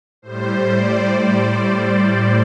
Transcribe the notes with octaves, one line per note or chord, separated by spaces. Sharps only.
A2 G3 C5
D5
C5